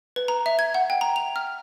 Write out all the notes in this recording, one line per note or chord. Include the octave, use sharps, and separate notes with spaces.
B4
A#5
E5
G#6
F#5
G5
A#5
F7
F6